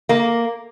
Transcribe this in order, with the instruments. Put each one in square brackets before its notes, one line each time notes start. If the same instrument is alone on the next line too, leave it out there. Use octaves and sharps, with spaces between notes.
[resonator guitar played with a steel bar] A#3